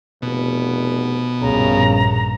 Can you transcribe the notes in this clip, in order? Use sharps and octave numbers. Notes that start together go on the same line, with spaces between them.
F1 B2
A#1 G2 C#3 A#5